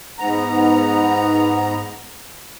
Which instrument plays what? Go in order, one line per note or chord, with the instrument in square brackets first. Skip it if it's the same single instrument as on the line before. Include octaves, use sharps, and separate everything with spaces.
[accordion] G#2 B3 A#5